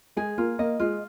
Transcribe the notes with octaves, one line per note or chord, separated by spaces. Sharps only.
G#3 G#4
A#3 F4
A#3 D#5
G#3 F4